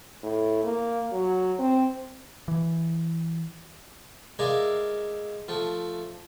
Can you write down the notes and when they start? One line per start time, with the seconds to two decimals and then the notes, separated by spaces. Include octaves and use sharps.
0.23 A2
0.64 A#3
1.12 F#3
1.59 C4
2.48 E3
4.39 G#3 A#4 D5 E5 F5
5.48 F3 A3